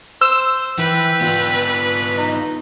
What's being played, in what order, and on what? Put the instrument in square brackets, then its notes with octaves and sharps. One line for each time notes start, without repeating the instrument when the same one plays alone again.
[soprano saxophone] C5 [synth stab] E6
[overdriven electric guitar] E3 [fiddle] B4 [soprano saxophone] G5
[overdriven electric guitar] B3 F4
[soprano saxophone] D#4